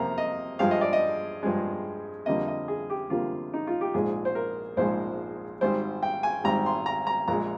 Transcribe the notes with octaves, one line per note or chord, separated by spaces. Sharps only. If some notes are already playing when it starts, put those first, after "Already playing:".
Already playing: F2 C3 F3 A#3 A#5
D#5
G2 F3 G#3 F5
D#5
D5
D#5
G2 F3 G#3
F2 D3 G3 A#3 D#5
D#5
G#4
G4
F2 D3 G3 A#3 F4
D#4
F4
G4
A#1 G#2 F3 G#3 G#4
C5
A#4
A#1 G#2 F3 G#3 C5
G#1 G#2 G3 C5
G5
G#5
G#1 G#2 G3 A#5
C6
A#5
A#5
A#1 A#2 G#3 A#5